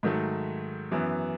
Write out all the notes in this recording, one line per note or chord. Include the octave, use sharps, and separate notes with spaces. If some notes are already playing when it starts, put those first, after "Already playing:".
G#2 D#3 F#3 A3
F#2 E3 B3